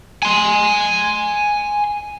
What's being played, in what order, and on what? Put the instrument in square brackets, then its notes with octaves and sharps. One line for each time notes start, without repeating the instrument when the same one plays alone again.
[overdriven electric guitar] G#5 C6